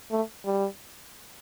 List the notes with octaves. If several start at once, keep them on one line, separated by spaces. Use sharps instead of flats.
A3
G3